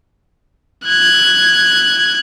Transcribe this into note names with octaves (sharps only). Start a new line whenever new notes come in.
F#6 G#6